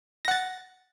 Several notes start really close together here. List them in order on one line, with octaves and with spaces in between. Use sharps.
A#6 F#5 A6